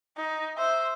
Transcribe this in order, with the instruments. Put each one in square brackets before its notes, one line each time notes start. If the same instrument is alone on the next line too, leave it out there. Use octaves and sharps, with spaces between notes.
[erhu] D#4
[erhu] C5 [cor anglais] E5